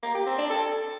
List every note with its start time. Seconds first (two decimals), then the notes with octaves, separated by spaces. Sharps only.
0.03 A#3
0.15 G4
0.26 C4
0.38 D4
0.50 A4